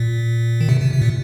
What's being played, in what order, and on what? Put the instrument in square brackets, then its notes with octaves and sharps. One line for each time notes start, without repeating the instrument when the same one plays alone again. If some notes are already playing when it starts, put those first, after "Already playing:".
Already playing: [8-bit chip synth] A#2
D#3
C3
C3
C3
A#2